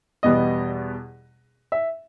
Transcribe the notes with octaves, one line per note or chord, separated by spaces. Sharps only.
E2 B2 G3 B3 D#5
E5